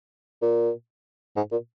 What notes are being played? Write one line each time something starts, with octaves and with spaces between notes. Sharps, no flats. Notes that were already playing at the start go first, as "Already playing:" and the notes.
A#2
G#2
A#2